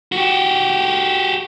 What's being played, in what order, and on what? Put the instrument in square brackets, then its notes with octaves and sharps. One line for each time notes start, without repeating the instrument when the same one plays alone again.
[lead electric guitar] F#4 G4